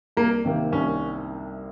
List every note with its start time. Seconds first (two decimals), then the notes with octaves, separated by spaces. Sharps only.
0.17 C2 A#3
0.45 C3 D#3 A#3
0.72 C2 C#4